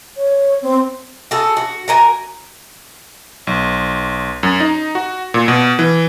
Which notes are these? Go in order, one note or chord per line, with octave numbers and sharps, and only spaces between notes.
C#5
C4
F#4 G#4 A4
F#4
F#4 A#4 G#5
B1
F#2
D#4
F#4
A#2
B2
E3